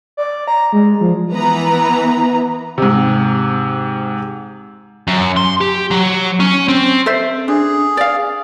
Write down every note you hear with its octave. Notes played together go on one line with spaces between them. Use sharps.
D5
A#5
G#3
F3
E3 B3 B4 A#5
G#2 C3
F#2
C6
G4
F#3
C#4
C4
A4 C5 E5
D4 G#4
D5 F5